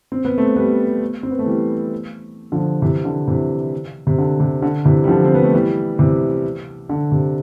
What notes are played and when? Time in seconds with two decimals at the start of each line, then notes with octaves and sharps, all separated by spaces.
0.12 C4
0.25 B3
0.38 A3 C4
0.56 G3 B3
1.23 C4
1.31 B3
1.39 A3
1.46 E3 G3
2.52 D3 F3
2.82 C3 E3
3.05 D3
3.28 C3 E3
4.07 C3
4.18 D3
4.40 C3
4.62 D3
4.85 C3 E3
5.04 G3
5.08 D3 F3
5.24 C4
5.35 B3
5.44 A3
5.54 E3 G3
5.99 C3 E3
6.89 D3
7.12 C3